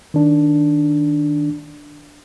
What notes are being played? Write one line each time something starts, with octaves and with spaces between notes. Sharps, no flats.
D#3 D4